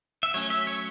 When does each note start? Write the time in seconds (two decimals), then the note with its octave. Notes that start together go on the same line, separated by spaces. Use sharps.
0.23 E5
0.34 F#3 A3 C#4 C#5
0.50 E5
0.67 C#5